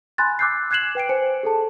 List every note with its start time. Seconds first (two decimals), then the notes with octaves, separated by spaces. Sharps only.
0.18 G#5 B5 C6 F#6 A6
0.39 D6 E6 F#6 G6 C7
0.71 F#6 G#6 C7 E7 F#7
0.95 B4 G5 C7 D7
1.09 C5 G#5 C#7
1.43 G#4 A4 A5